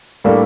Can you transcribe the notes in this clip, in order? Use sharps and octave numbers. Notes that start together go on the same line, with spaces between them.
A2 G3 A#3 D4 A4